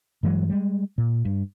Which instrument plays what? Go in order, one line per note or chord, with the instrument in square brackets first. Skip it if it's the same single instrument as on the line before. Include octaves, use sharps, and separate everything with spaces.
[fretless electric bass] G2 E3 F#3 G#3
G3 G#3
A#2
G2